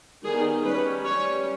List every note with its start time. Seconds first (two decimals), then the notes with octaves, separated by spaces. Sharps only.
0.24 D#3 G3 B3 D#4 G#4
0.64 G3 C#4 B4
1.05 G3 C#4 C#5